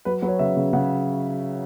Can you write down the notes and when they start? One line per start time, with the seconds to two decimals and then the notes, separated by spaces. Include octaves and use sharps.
0.05 F#3 B4
0.22 F#3 B4
0.28 C#5
0.39 C#3 E5
0.57 C#3
0.73 C#3 F#5